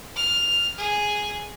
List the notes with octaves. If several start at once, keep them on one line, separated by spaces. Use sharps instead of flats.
F6
G#4